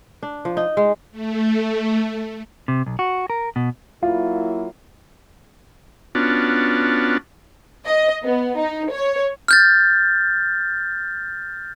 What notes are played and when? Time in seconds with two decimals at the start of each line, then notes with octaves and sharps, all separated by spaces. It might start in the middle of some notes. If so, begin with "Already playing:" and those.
0.23 D4
0.45 F3
0.57 D#4
0.77 G#3
1.12 A3
2.68 C3
2.86 B1
2.99 F#4
3.30 A#4
3.56 B2
4.03 F#3 A#3 E4 F4
6.15 B3 C#4 D4 F4 F#4 A5
7.86 D#5
8.24 B3
8.58 D#4
8.91 C#5
9.48 F6 G6 A6